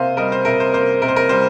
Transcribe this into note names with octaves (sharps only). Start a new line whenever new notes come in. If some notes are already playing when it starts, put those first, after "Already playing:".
Already playing: C3 A#3 C5 F5
G3 A#4 D#5
C5
C3 A#4
C5
A#3 C5
C3 A#4
C5
A#4
G3 C5